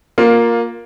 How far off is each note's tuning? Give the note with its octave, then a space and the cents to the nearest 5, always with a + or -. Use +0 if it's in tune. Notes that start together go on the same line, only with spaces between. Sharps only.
A#3 +0 F4 +15